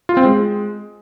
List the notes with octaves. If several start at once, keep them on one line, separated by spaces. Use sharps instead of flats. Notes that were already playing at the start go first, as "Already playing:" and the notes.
F4
C4
G#3